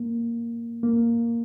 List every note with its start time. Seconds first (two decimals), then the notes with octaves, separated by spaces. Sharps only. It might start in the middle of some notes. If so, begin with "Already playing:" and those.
Already playing: A#3
0.83 A#3